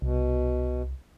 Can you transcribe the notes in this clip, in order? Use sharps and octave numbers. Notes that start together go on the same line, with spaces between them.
C2 B2